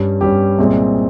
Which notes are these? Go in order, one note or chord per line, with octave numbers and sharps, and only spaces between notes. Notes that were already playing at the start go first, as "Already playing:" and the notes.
Already playing: G2 G3 C#4
G2 G3 C#4 G4
C2 A#2 G#3 C4